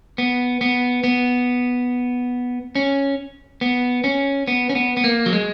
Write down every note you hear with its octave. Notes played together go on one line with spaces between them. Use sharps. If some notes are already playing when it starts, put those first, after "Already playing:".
B3
B3
B3
C#4
B3
C#4
B3
C#4
B3
B3
A#3
F#3
G#3